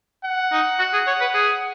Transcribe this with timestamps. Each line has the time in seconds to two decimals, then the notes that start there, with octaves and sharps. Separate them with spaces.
0.25 F#5
0.52 D#4
0.79 F#4
0.93 G#4
1.07 C#5
1.20 B4
1.34 G#4